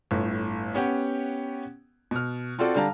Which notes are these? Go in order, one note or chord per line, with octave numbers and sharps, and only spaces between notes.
G1 A2
B3 C#4 G4 F#5 G5
B2 F6
C4 F4 F#4 A4 D5
D3 G3 F5 A5 A#5